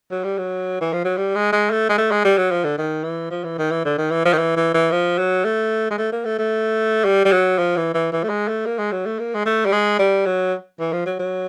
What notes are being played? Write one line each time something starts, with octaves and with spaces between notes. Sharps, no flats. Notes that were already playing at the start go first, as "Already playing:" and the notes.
F#3
G3
F#3
E3
F3
F#3
G3
G#3
G#3
A3
G#3
A3
G#3
G3
F#3
F3
D3
D#3
E3
F3
E3
D#3
E3
D3
D#3
E3
F3
D#3
E3
E3
E3
F3
F#3
A3
G#3
A3
A#3
A3
A3
G3
G3
F#3
F3
E3
E3
E3
A3
G#3
A3
A#3
G#3
F#3
A3
A#3
G#3
A3
G3
G#3
G3
F#3
E3
F3
F#3
F#3